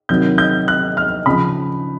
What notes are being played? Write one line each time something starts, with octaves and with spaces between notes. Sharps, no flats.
C3 D#3 F#3 G6
G6
F#6
F6
C#3 F3 B5